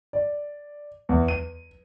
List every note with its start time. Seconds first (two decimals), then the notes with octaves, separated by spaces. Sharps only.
0.13 D5
1.09 E2
1.28 D#7